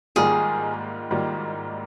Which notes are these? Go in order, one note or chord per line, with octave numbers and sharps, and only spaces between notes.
G#2 D#3 G3 A#3 F4 G#4
G#2 D#3 G3 A#3 F4